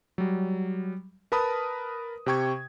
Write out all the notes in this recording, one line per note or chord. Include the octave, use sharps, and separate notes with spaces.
F#3 G3
A#4 B4 A5 B5 D#6
C3 G4 G5 C#6 G#6